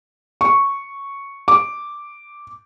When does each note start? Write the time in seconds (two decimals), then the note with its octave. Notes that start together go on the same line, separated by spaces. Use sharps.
0.41 C#6
1.48 D6